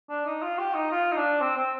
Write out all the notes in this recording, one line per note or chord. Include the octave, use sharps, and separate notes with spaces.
D4
D#4
F4
G4
D#4
F4
D#4
D4
C4
C4